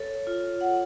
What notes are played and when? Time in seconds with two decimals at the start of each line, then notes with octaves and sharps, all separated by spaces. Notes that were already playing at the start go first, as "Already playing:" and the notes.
Already playing: A4 C#5
0.27 F4
0.61 F#5